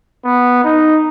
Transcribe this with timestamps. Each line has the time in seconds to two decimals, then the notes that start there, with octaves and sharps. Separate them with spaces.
0.25 B3
0.64 D#4